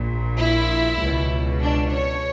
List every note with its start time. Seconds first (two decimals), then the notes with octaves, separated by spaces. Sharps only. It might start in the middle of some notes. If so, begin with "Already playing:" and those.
Already playing: A#1 A#2
0.37 E4
0.98 C#2 B2
1.60 D4
1.90 C#5